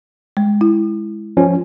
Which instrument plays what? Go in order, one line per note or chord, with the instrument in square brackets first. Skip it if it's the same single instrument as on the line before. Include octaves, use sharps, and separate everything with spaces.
[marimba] G#3
E4
[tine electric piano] F3 C#4